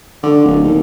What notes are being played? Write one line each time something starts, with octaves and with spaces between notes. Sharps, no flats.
D3
D1
D#2